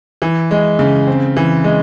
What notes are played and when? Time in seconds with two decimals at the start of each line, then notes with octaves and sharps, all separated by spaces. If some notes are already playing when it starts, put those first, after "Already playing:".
0.22 E3
0.51 G#3
0.79 C#3
1.08 C4
1.37 E3
1.64 G#3